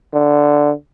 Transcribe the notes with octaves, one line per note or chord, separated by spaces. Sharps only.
D3